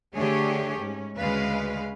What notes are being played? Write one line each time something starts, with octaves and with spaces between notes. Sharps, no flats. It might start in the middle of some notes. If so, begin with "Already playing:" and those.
D3 A3 D4 G4 G#4 C#5
G#2 C#4
D2 C#3 G#3 B4 F5